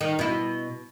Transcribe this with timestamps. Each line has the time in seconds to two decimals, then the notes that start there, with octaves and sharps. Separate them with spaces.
0.01 D#3
0.19 B2 E4